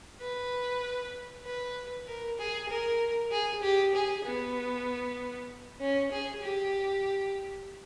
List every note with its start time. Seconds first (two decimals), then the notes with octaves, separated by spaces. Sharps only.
0.21 B4
1.45 B4
2.06 A#4
2.38 G#4
2.69 A#4
3.31 G#4
3.62 G4
3.94 G#4
4.25 B3
5.80 C#4
6.11 G#4
6.42 G4